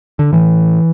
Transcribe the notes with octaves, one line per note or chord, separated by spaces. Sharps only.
D3
A2 E3